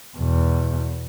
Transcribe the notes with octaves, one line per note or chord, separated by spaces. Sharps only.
E2 B2